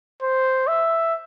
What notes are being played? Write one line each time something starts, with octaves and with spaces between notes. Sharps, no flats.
C5
E5